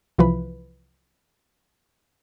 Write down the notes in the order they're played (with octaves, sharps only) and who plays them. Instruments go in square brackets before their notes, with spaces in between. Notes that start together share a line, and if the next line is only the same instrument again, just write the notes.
[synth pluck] C2 E3 F3 B4